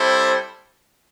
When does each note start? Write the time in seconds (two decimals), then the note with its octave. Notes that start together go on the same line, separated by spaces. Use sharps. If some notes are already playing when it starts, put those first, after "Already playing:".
Already playing: G3 C4 E4 A4 C5